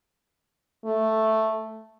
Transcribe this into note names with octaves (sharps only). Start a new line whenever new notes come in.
A3